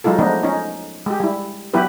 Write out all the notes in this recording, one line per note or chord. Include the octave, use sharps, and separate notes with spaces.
F#3 G#3 D#4 F4 A4
F3 G#3 A3 B3 D4 D#4
C#4 D#4
G#3 G4
G3 E4
F#3 B3 E4 G4 B4